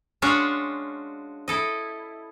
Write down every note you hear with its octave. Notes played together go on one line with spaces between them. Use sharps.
G#3 C#4 D4 F4 F#4 C#5
E4 A4 D#5